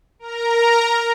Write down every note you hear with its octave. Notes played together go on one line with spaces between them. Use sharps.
A#4 A#5